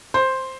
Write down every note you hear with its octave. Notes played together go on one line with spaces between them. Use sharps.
C5